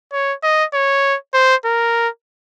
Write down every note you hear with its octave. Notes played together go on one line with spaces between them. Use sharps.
C#5
D#5
C#5
C5
A#4